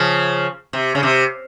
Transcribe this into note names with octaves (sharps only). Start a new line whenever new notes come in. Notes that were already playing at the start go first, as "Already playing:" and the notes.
Already playing: C#3 F3
C3
C#3
C3